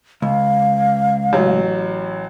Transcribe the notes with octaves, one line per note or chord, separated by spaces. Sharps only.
C#2 F5
A1 F#3